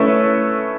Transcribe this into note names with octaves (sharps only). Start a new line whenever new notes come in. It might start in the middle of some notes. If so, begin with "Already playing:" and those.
Already playing: A3 C#4 E4 B4 E5